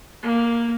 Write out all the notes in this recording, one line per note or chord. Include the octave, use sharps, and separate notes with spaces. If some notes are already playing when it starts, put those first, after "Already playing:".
A#3